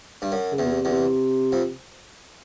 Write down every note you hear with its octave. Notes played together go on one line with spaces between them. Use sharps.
G2
F#2
C#3
E2
B2
C3
E2
C3
F2